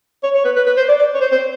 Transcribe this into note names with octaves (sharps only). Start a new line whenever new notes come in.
C#5
C#5
B4
B4
B4
C5
D5
D5
C#5
C5
C5